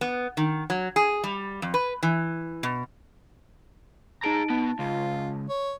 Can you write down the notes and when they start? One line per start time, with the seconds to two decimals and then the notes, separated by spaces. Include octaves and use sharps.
0.01 B3
0.37 D#3
0.70 F#3
0.96 G#4
1.24 G3
1.62 F2
1.74 B4
2.03 E3
2.63 B2
4.24 D#4 G#4 A5 A#5 D7
4.50 B2 B3 A5
4.79 C#2 F4
5.50 C#5